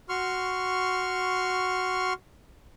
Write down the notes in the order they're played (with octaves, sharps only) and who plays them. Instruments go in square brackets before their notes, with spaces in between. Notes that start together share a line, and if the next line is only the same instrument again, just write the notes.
[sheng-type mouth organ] F#4 C6 C#6 F6